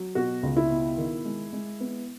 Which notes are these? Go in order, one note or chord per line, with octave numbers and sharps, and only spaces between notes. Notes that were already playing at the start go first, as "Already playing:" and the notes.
Already playing: F#3
B2 F#4
C#2
E4
B2
D#3
G#3
G#3
B3